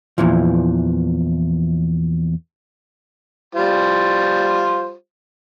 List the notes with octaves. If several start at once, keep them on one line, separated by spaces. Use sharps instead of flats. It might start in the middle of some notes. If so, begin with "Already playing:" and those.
E2 A#2 E3 F3
G3 F4 C5